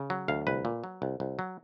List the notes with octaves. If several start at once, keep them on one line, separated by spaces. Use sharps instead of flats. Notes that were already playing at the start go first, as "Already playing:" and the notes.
Already playing: C#3
F#3
D2 F5
C2 B4
A#2
F#3
C2
C2
F#3